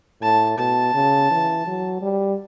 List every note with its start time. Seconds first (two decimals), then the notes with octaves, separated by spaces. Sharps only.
0.22 A2 A5
0.58 B2 A5
0.94 C#3
1.31 E3
1.67 F#3
2.02 G3